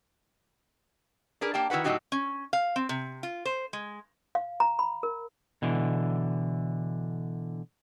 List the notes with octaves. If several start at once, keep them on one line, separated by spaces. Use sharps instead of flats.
D4 G#4 A#4 B4
A#3 G4 G5 A5
D#3 E4 F#4 B4 F#5
A2 C#3 F#3 D#4 F#4 G4
C#4
F5
C4
C3
F4
C5
G#3
F5
A#5
B5
A#4
B2 D3 E3